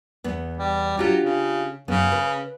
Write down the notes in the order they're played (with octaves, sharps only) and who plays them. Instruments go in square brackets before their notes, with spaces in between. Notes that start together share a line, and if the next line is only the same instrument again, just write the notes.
[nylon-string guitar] E2 B3
[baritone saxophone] G3
[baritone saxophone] F#3 [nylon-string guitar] D4 F4 G4
[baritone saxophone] C#3
[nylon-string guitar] F#2 B3 [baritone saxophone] C#3
[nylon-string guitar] B4